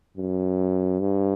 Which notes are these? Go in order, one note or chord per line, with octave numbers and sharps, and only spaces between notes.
F#2
G2